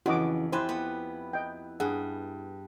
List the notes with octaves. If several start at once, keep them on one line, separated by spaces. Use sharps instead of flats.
F2 C#3 E3 F#4 D#5 D6
E4 G4 C5 G#5 A5 B5 F#6
B3
D#5 G5
G2 G#4 F#5